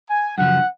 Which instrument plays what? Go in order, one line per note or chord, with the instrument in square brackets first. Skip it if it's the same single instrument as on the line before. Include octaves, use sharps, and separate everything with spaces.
[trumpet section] G#5
[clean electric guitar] F#2 C#3 F3 [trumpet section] F#5